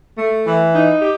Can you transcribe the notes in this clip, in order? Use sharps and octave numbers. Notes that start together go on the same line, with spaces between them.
A3
E3
D#4
G4